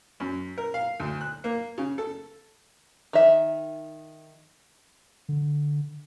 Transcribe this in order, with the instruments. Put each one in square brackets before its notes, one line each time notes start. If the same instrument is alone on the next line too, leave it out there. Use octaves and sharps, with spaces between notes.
[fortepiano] F#2
A#4
F5
D2
F#6
A#3
C#3
A4
[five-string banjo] D#3 E5
[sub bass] D3